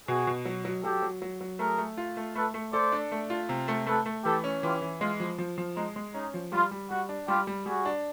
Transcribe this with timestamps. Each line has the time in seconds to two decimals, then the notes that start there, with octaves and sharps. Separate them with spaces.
0.08 B2 F#4 G#4
0.27 B2
0.45 F#3
0.65 F#3
0.84 F#3 G4 A4
1.02 F#3
1.22 F#3
1.41 F#3
1.59 A3 G#4 A#4
1.78 A3
1.98 F4
2.17 A3
2.35 A3 A4 B4
2.54 A3
2.73 A4 C5 D5
2.92 D4
3.12 A3
3.30 F4
3.49 C3
3.68 A3
3.87 A3 A4 B4
4.06 A3
4.24 E3 G4 A4
4.44 C#4
4.63 E3 F4 G4
4.82 E3
5.00 G#3 F4
5.20 F3
5.38 F3
5.58 F3
5.76 G#3 D#4
5.96 G#3
6.14 C#4 D#4
6.34 F3
6.52 G3 F4
6.71 G3
6.90 G3 F#4
7.09 D4
7.28 G3 F4 G4
7.47 G3
7.66 G3 F#4 G#4
7.85 D4